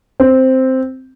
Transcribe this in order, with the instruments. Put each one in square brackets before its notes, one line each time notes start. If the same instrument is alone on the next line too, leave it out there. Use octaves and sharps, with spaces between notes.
[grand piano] C4